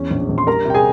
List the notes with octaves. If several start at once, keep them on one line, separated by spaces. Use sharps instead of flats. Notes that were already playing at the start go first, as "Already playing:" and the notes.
Already playing: E2 C#4
A#1
A#1
C6
G3 A#4 A#5
C3 G5
G#4 G#5